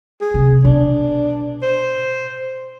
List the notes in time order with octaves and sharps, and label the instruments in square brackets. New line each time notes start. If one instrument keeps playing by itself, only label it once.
[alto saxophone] G#4
[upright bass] C3
[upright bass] B2 [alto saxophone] D4
[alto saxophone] C5